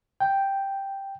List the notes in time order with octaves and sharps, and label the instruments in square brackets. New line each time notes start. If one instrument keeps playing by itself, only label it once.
[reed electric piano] G5